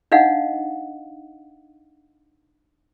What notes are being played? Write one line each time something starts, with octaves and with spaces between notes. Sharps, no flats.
D4 D#4 D#5 F5 F#5